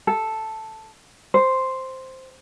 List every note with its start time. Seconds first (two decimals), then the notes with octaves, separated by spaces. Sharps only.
0.07 A4
1.34 C5